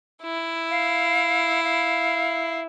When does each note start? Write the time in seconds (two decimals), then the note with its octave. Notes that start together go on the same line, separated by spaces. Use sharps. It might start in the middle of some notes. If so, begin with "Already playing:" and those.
0.23 E4
0.71 F5
1.64 F5